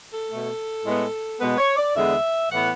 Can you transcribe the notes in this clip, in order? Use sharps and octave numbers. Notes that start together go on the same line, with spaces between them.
A4
B2 A3
A2 G#3 B3
B2 G#3 B3 B4
C#5
D5
E2 D3 G#3 B3 E5
A2 E3 B3 F#5